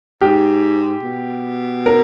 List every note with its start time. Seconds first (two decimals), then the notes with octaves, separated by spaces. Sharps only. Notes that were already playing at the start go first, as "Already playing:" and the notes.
0.21 G#2 G4
1.03 B2
1.86 A#4